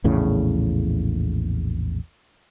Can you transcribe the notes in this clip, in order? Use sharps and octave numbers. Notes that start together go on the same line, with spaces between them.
A#1 E2 A2 C#3